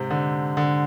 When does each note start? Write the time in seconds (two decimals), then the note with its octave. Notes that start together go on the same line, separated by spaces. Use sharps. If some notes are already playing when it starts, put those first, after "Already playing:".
Already playing: G#2 C3
0.11 D3
0.57 D3